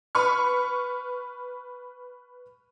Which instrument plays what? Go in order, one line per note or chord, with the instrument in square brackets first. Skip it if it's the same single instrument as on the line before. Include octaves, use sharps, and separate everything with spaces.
[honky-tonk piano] B4 B5 C#6 F6